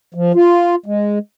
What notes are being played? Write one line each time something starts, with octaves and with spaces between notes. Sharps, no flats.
F3
F4
G#3